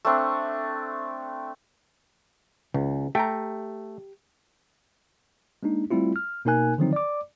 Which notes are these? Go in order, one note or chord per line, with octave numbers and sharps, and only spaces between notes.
A3 C4 D4
C#2 C#3
A3 G4 G5 A#5
G#3 A#3 D4 D#4
G3 A3 C4 E4 F4
F6
B2 A#3 D#4 A#4 G#5 F#6
D3 D#3 F3 F#3 C4 D#4
D5 D6